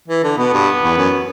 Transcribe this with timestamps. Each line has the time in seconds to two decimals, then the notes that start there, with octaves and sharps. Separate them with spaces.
0.08 E3
0.23 D3
0.38 B2 B3
0.53 G2
0.82 E2
0.97 F#2